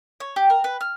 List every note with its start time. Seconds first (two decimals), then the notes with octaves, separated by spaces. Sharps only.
0.20 C#5
0.36 G4
0.50 A#4
0.64 B4
0.81 F6